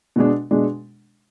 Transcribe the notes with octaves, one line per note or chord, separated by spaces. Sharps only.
B2 G#3 D4
B2 G#3 D4